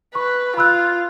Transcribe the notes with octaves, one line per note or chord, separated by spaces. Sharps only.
B4 C#6
F4 B5 E6 F#6